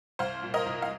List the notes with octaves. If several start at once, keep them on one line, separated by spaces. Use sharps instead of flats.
C2 C5 F5
A#2
A#4 D#5
C2
F5